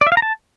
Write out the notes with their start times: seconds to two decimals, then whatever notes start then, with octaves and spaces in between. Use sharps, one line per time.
0.01 D5
0.07 E5
0.12 F5
0.17 A#5
0.22 A5